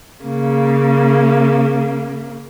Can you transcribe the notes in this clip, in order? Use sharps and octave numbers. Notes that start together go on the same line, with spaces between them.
C#3 A#3